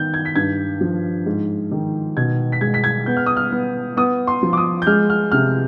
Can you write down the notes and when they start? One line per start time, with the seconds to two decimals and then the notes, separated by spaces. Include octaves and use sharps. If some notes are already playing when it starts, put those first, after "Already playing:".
Already playing: D#3 B3 G6
0.14 G#6
0.25 B6
0.36 G2 G#6
0.81 F3
1.26 G#2
1.71 D#3
2.17 B2 G#6
2.52 B6
2.61 G#3 G#6
2.74 B6
2.84 G#6
3.06 B3 G6
3.17 F6
3.26 D#6
3.37 F6
3.52 B3
3.97 B3 D#6
4.27 C6
4.43 F3
4.53 D6
4.57 D#6
4.82 G6
4.87 G#3 F6
5.10 F6
5.32 C3 F6